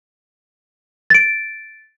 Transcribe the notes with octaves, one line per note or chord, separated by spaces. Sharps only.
A6 D7